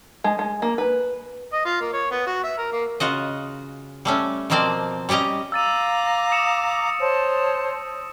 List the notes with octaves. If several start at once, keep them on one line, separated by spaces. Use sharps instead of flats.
G#3
G#3
A#3
B4
D#5
F4
A#3
C#5
B3
F#4
E5
A#4
A#3
C#3 F4 F#4 D#5
G3 A3 C#4
B2 F3 A#3 C4 C5 D5
G3 C#4 G4 D#5 A#5
F5 A#5 D6 E6 A6 D#7
A#6
D#6 C#7 E7
C5 C#5 A5